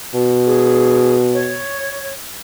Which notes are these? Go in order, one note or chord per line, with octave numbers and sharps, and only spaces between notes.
B2
G#4
C#5